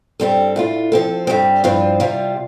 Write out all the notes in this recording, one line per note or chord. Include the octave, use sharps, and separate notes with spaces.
G2 G3 C4 A4
A2 A3 F4
F3 C4 A4
G2 G3 C4
G2 F3 C4 F4
C3 G3 F4